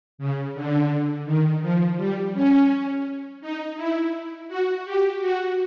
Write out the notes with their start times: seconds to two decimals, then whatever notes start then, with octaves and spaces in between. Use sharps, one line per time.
0.18 C#3
0.54 D3
1.25 D#3
1.62 F3
1.97 G3
2.34 C#4
3.41 D#4
3.76 E4
4.48 F#4
4.85 G4
5.20 F#4